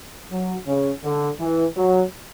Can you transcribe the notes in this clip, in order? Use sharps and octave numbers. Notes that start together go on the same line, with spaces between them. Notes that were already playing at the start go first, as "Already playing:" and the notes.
F#3
C#3
D3
E3
F#3